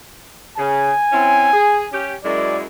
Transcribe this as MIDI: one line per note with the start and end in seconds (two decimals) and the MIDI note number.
0.58 0.91 49
0.58 2.04 80
1.12 1.48 60
1.12 1.48 61
1.12 1.48 64
1.53 1.84 68
1.92 2.14 61
1.92 2.14 67
2.24 2.65 42
2.24 2.65 56
2.24 2.65 64
2.24 2.58 74